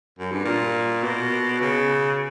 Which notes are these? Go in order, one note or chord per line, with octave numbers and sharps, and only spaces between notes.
F#2
G2
A#2
B2
C#3